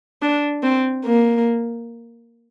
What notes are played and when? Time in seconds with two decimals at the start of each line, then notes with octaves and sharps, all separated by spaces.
0.22 D4
0.63 C4
1.05 A#3